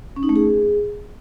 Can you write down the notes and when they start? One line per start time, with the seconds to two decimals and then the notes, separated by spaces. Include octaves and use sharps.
0.16 C#4
0.23 D#4
0.29 A3
0.36 G#4